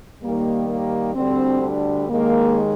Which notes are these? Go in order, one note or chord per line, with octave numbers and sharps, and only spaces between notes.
D#2 D#3 G3 A#3
A#3
D2 D3 G3 C4
D4
D#2 D#3 G#3 A#3